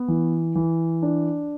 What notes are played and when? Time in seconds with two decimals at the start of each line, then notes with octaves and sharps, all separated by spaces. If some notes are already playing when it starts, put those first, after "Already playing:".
Already playing: B3
0.08 E3
0.55 E3
1.02 D4